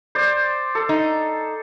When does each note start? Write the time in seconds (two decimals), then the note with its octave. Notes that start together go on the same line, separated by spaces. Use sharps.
0.15 C5 D5
0.75 A4
0.89 D#4